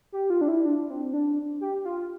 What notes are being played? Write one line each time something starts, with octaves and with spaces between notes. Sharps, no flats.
G4
F4
D4
E4
D4
C4
D4
G4
F4